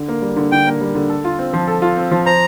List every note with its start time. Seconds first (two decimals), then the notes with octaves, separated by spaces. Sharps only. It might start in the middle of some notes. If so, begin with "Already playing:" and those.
Already playing: D3
0.08 A#3
0.22 G3
0.36 D3
0.52 D3 G5
0.67 A#3
0.81 G3
0.95 D3
1.09 A4
1.24 F4
1.39 C4
1.53 F3
1.68 A4
1.82 F4
1.97 C4
2.11 F3
2.26 C5 A#5